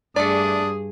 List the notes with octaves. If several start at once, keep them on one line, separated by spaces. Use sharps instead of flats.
G2 A3 D4 G#4 D5 D#6